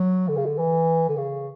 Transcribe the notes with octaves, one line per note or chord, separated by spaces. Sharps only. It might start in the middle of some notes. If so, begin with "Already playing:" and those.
Already playing: F#3
D3
C#3
D3
E3
D3
C#3